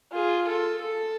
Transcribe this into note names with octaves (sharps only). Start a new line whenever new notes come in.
F4 G#4
A4
A4